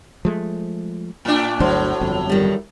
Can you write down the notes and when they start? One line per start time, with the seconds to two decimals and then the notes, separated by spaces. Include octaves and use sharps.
0.25 F3 G#3 A3
1.25 A2 D4
1.60 G1 D2 A2 F#3 D4 C5
2.01 G1 F2
2.30 D#3 G3